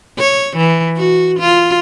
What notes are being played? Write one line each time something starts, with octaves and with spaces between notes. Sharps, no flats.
C#5
E3
F#4
F4